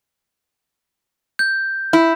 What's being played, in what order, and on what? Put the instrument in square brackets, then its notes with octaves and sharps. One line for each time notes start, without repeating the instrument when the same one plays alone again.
[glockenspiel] G6
[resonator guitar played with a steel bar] E4